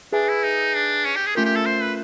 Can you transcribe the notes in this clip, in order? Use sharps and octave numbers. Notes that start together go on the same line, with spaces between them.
D4 G#4 B4 E5 G#5
E4
D#4
D4
C#4
G4
G#4
A3 C#4 F4 G4 A#4
G4
A4
C5
B4